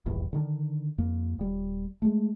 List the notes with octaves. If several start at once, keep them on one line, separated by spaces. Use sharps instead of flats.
D#1 A#1 E2 G2
D3 D#3 D4
F2 A#3
D#1 G3
G#3 A3